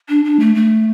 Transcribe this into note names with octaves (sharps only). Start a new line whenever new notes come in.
D4
D4
A3
A3